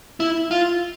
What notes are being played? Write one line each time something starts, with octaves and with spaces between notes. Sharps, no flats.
E4
F4